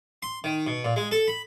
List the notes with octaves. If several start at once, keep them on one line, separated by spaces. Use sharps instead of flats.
C6
D#3
B2
A#2
G#3
A4
B5